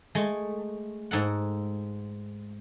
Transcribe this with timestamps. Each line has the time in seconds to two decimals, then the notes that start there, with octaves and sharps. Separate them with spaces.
0.15 G#3 A3
1.11 G#2 A4 F#5